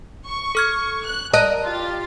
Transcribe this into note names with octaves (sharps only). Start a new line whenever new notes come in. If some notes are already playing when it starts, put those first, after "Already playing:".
C#6
A4 F6 G#6
F#6
A#4 D#5 A5 F#6
F4 G4 A6